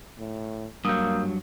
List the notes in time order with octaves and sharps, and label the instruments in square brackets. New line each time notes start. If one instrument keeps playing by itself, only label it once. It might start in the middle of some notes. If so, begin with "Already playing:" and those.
[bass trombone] A2
[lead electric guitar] G2 F#3 [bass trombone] A#3 [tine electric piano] D#6 E6 G6